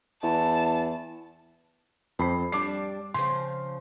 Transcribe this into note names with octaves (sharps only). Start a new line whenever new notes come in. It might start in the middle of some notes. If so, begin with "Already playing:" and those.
E2 A5
F2 C5 B5 C7
G3 D4 D6 C7
C#3 F3 C4 C6